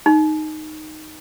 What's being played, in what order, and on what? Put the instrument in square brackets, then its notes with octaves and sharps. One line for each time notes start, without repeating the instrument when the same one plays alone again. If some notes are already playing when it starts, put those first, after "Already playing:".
[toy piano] D#4